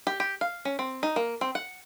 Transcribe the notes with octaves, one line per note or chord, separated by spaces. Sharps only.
G4
G4
F5
C#4
C4
D#4
A#3
C4
F#5